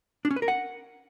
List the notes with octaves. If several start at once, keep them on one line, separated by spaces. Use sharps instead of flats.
D4
C#4
B4
A#4
F#5